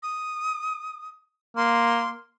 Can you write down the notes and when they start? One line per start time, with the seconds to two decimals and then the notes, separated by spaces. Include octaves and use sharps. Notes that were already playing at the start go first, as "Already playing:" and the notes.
0.03 D#6
1.57 A#3 C6